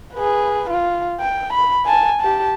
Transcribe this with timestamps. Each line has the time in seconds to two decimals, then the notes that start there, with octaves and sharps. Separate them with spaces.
0.14 G#4 B4
0.70 F4
1.21 G5
1.53 B5
1.86 G#5 A5
2.21 G4 A5